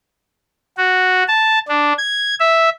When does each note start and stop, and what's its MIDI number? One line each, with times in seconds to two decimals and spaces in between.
0.78 1.24 66
1.28 1.59 81
1.68 1.93 62
1.98 2.35 92
2.40 2.70 76